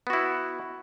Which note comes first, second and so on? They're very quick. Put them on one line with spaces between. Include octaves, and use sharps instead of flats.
B3 F#4 E4